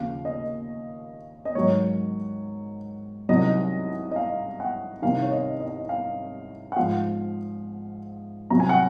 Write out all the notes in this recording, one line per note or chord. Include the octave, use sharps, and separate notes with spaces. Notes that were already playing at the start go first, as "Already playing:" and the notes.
Already playing: D#2 C#3 F3 F5
D#5
D#5
G#2 D#3 F#3 C#5
C2 C3 D#3 F#3 D#5
D#5
F5
F#5
C2 C3 D#3 F5
C#5
D#5
D#5
F5
F#5
G#2 F3 F5
C2 C3 F#3 A#5
G#5
F#5